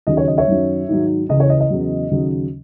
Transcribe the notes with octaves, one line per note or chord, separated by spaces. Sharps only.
D#2 C#3 F#3 D#5
C#5
D#5
C#5 E5
F#2 D#3 F#3
G#2 D#3 F#3
C#2 C#3 E3 D#5
C#5
D#5
D#5
E2 C#3 F#3
D#2 C#3 F#3